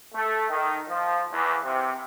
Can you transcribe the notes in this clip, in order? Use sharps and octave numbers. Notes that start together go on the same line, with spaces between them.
A3
D#3
F3
E2
C3